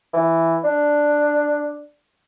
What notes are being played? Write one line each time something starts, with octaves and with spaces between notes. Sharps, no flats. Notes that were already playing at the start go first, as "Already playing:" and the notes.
E3
D4